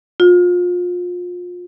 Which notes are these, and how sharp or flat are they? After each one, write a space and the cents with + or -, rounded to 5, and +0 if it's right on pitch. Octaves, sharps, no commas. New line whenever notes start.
F4 +30